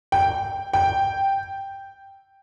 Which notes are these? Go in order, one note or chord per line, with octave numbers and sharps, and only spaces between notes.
G5
G5